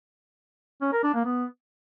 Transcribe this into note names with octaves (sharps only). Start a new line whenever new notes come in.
C#4
A#4
D4
A#3
B3